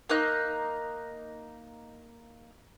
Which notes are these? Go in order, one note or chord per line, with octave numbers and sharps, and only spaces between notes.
A#3 D#4 F#6